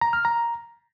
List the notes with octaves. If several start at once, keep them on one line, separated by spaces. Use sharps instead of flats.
A#5
F6
A#5